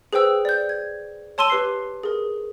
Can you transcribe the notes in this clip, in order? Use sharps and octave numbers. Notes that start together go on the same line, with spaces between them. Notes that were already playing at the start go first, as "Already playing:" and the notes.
G#4 B4 C5 G5 E6
D5 G6
G#6
C#5 A5 C6 E6 D#7 G7
G4 B4 C6 C7
G#4 A#4